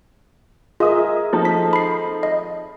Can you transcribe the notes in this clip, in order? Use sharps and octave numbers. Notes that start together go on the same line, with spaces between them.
F4 G#4 A#4 D#5 E5 D#6
F3 C4 D#4 A4
B6
B5 C7
D#5